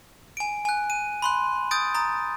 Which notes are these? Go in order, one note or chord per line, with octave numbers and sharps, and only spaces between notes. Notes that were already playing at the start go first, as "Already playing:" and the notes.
G#5 D7
G#5 F#6
D#7
B5 C6 F#6
D#6 G6 A6 D7
A#5 D#6 A6